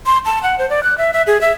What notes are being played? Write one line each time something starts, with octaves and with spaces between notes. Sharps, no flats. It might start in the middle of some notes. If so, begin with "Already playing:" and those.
C6
A5
F#5
C5
D5
F#6
E5
E5
G#4
E5